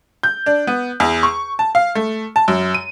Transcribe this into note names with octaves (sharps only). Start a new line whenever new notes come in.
G6
D4
B3
E2
C#6
A5
F5
A3
A5
F#2
D#7